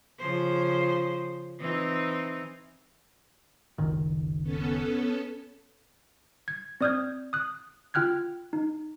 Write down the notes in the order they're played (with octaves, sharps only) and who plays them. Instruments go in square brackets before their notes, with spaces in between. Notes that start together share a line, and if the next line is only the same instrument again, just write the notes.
[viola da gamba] C#3 F3 C5
E3 C4 D#4
[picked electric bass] F#1 C#2 D#3
[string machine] B3 C#4 A4
[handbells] G#6
C4 D5 D#6 F6 G6 G#6
D#6 F#6
F4 G5 F6 F#6 G#6
D#4